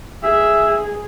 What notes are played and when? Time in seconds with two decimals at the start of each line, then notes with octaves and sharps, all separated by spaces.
0.23 G#4 E5